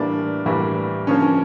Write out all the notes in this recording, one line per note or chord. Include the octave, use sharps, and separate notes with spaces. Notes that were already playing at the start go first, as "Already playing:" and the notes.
Already playing: A2 E3 G3 A#3 D4
A2 E3 G3 A#3
D3 F3 A#3 C#4
C#4